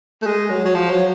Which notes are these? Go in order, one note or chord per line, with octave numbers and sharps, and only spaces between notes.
A3
G#3
F#3
F#3
F3
F#3